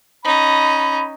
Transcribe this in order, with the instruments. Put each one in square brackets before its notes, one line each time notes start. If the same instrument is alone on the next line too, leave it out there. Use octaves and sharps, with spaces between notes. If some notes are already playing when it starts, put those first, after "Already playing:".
[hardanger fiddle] C#4 D#4 [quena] B5